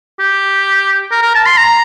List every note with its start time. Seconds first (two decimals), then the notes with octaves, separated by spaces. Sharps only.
0.19 G4
1.11 A#4
1.22 A#4
1.35 A5
1.46 C6
1.57 A#5